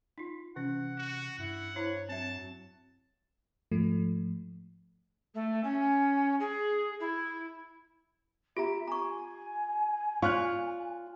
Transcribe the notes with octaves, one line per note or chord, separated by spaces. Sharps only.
D#4 F4
C3 E3 C#4 F#5
F#4
G2 E4 F#5
E4 C5 C#5 A#5
F#3 C4 E5 A5
G#2 F3 A3
A3
C#4
G#4
E4
F4 G4 E5 A#5 D7
G#5 A#5 C#6
F4 C#5 D5 F5 C#6 F6 F#6